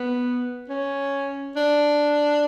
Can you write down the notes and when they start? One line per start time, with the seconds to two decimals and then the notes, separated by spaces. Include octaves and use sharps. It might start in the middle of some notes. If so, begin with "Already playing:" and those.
Already playing: B3
0.69 C#4
1.56 D4